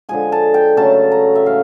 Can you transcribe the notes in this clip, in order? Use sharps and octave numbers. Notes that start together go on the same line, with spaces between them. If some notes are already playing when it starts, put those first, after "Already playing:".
D3 F3 G#3 G#5
A5
G5
C#3 F#3 A3 A5
A#5
E5
A2 E3 G#3 F5